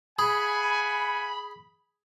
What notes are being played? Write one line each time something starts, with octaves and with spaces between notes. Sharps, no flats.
G#4 F5 F#5 G#5 B5